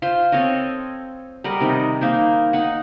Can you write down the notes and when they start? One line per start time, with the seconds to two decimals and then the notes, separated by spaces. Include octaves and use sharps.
0.02 F4 C5 C6
0.32 C4 A4 C#5 D#5
1.44 G3 A#4 D#5 F#5
1.60 C3 D#3
2.01 A#3 D#4 C5
2.53 D#4 F#5